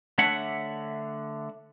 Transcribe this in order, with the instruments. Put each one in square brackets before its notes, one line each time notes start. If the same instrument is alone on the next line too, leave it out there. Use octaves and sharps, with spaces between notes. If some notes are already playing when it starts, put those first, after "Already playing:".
[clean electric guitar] D3 A3 D4 C#5 E5 F#5